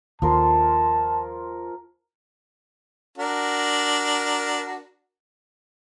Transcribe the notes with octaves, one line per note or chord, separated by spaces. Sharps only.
D#2 F3 A#4 A5 C6
D4 F#4 A#4